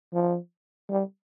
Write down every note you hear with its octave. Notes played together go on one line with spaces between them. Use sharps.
F3
G3